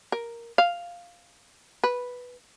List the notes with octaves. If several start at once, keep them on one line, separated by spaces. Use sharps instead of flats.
A#4
F5
B4